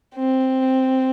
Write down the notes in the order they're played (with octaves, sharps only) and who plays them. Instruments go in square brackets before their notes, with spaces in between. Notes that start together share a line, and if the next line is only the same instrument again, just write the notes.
[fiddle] C4